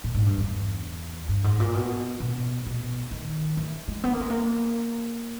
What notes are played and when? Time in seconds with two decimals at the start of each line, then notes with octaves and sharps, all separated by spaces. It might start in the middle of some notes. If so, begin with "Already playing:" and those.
0.04 A#2
0.15 G#2
0.26 G2
0.37 E2
1.29 G2
1.44 G#2
1.60 A#2
1.74 B2
2.20 B2
2.66 B2
3.11 D#3
3.57 E3
3.88 G#3
4.04 B3
4.13 A#3
4.21 G#3
4.30 A#3